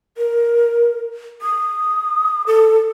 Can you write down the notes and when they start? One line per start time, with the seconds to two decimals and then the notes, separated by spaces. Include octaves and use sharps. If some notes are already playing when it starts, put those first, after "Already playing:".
0.18 A#4
1.42 D#6
2.47 A4